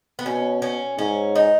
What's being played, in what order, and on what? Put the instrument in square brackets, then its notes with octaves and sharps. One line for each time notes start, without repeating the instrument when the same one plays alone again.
[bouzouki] B3
[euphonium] B2 [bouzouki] C#4
[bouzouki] C#4
[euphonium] G#2 [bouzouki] C#4
[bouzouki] D#4